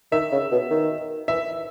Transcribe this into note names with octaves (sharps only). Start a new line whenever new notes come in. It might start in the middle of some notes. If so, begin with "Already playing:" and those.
D#3 E5
C#3
B2
D#3
E3 E5